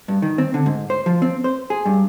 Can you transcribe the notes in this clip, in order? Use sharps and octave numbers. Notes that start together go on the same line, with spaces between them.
G2
D#3
C4
D3
G#2
C5
F3
C4
C5
G#4
G2